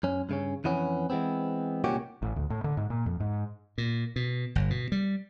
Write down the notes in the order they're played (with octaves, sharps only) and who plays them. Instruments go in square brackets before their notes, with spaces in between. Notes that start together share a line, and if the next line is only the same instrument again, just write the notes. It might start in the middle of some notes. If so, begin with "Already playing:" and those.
[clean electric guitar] F#2 C#4
G2 C#3 C#4
F2 E3 B3 C#4
E3 G#3 B3 C4
C2 A#2 D#3 C#4 F#4 G4
[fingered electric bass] A1
D2
A2
D3
G#2
A#2
F2
G#2
[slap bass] A#2
B2
G1
B2
G3